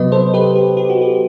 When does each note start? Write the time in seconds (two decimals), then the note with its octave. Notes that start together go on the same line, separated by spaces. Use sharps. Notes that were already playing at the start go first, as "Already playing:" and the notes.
Already playing: C3 F#3 B3 B4 D#5
0.12 A4 C5
0.34 G4 B4
0.56 G4
0.77 G4
0.90 F#4
1.01 G4